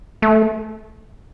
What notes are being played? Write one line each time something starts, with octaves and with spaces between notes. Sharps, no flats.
A3